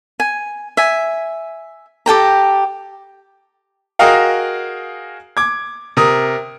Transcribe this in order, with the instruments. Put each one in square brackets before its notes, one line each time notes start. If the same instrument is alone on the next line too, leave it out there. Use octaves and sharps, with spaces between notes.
[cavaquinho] G#5
E5 G#5
G4 A4 G5 A#5
[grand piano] F#4 G#4 A#4 D#5 F5 G5
D6 G#6
C3 A#4 D#6